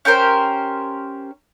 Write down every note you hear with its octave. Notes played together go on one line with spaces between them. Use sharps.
C#4 G4 A#4 C5